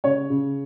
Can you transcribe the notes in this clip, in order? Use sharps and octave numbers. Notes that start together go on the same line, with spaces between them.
C#3 C#5
C#3